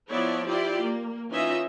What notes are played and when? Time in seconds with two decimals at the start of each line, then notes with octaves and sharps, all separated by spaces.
0.11 F3 B3 E4 C#5 D5
0.48 E4 F4 G4 D5
0.85 A#3
1.31 E3 C#4 D#4 F4 D#5 E5